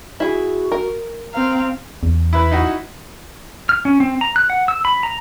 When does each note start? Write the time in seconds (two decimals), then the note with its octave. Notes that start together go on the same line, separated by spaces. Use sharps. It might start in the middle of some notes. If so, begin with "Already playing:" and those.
0.20 E4 F#4 G#4
0.72 A#4
1.34 C4 F5 A#5
2.03 E2
2.33 E4 B4
2.51 D#4 E4 F#4
3.69 F6
3.85 C#4
4.00 C4
4.21 A#5
4.36 F#6
4.50 F#5
4.68 E6
4.85 B5
5.03 A#5